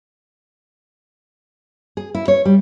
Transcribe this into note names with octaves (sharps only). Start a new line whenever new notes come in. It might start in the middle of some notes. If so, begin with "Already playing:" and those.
G#4
E4
C#5
G3